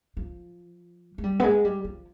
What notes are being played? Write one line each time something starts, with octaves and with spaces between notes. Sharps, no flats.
F3
G#3
G3
B3
G#3
G3
F3